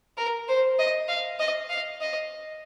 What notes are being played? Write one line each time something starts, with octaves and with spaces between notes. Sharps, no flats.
A#4
C5
D#5
F5
D#5
F5
D#5